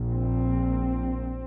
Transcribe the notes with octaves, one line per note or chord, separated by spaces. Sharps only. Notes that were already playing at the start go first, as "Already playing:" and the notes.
Already playing: A#1 A#2
C4